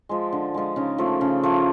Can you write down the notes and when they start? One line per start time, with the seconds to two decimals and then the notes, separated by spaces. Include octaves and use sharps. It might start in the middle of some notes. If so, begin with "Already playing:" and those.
0.09 F3 G#3
0.32 D3
0.54 F3 G#3
0.76 C#3 D#4
0.98 F3 A3
1.21 C#3
1.43 F3 A3